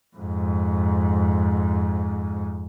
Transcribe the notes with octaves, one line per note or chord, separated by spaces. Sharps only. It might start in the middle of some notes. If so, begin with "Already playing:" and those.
F2 G#2